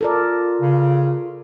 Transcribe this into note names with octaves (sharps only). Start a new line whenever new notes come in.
F4 A4 A#4 D5
C#3